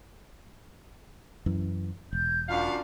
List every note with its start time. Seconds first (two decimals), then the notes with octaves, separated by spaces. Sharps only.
1.46 F#2 E3
2.13 E1 G6
2.49 F#2 D4 F4 F5